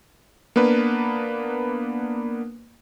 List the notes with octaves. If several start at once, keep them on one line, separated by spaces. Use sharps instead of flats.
A#3 B3 D4 B4